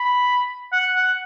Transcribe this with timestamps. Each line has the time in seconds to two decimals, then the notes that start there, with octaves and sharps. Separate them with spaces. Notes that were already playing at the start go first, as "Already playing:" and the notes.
Already playing: B5
0.72 F#5
0.96 F#5